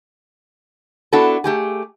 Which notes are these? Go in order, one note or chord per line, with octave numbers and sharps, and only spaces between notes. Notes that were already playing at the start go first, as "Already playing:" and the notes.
B3 D4 E4 F#4 A4
A3 G4 G#4